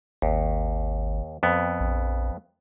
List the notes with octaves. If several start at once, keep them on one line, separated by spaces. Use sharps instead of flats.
G#1 D#2
F2 B3
A#1